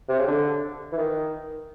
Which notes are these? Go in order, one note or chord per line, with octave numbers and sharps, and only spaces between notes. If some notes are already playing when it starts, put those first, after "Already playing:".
C3
C#3
D3
E3
D#3